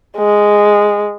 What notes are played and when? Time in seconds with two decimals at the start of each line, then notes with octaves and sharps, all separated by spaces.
0.17 G#3